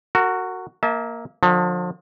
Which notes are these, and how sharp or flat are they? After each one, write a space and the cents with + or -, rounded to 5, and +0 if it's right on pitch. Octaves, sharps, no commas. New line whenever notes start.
F#4 +0 A#4 -35
A#3 +0 E5 -40 A5 -20
D3 +30 F3 +35